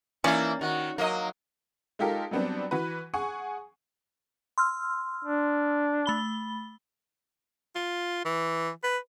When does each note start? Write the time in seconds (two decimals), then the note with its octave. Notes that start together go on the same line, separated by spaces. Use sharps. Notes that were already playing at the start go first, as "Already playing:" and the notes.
0.24 E3 A#3 C#4 E4 D5
0.61 D#3 F#4
0.98 F#3 A#3 D#5
1.99 G#3 D#4 F4 G4 A4 A#4
2.31 F#3 G3 B3 C4 D4
2.71 E3 F#4 B4
3.14 G#4 F#5 G#5 C#6
4.58 C6 E6 F6
5.24 D4
6.06 A3 B5 G7
7.75 F4
8.25 E3
8.83 B4